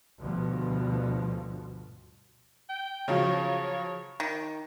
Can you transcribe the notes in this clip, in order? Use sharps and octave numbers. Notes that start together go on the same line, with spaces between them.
D2 G2 B2 F3
G5
C#3 F3 F#3 C#5
D#3